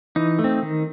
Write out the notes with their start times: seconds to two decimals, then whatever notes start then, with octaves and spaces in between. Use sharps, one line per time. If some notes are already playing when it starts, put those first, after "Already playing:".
0.16 E3 D#4
0.39 A3
0.44 C4
0.63 D#3